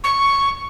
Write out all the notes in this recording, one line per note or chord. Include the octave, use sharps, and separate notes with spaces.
C#6